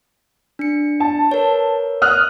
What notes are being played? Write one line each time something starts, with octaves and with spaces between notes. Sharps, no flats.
D4 C#7
A5
A#4 B4 C#5
D#6 F6 F#6